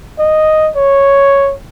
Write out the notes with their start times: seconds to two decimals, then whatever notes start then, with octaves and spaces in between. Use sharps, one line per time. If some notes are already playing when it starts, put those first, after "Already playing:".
0.19 D#5
0.76 C#5